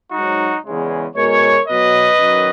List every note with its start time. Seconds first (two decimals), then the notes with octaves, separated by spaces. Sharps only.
0.12 G#2 D#4 F#4
0.17 F#3
0.65 E2 C#3 G#3
1.15 B2 G#3 A#4 C#5
1.67 B2 F#3 B4 D#5
2.19 F#2 D#3 F#3